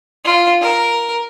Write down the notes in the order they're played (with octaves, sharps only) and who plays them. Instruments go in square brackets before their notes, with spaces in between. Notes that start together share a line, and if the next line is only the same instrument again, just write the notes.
[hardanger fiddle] F4
A#4